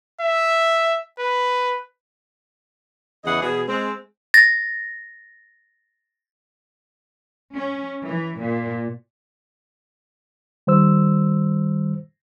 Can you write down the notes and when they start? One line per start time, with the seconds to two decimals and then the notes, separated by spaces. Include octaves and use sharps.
0.21 E5
1.19 B4
3.25 E2 C#3 E3 G#4 D#5 F#5
3.42 E2 B2 G#4
3.67 G#3 C4
4.34 A6 A#6
7.56 C#4
8.03 E3
8.38 A#2
10.67 D#3 G3 C5 E6